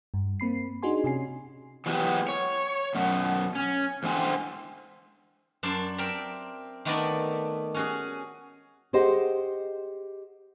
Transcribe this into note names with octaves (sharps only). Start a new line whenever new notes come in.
G2
A#3 C4 B5 C7
D4 D#4 F#4 G#4 G#5 C6
C3 C#4 G#5 C7
E3 F#3 G#3 B3 G4
C#5
F#2 B2
C#4
E2 G#2 D3 C4 G#5
F#2 D4 A5 C6
C4 A#4 E5 G5 A#5
D#3 A3 B3 D4 D5 A#5
C#4 F#4 G#4
G4 G#4 C5 D#5 F#5